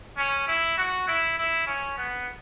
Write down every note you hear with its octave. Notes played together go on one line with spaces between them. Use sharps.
C#4
E4
F#4
E4
E4
C#4
B3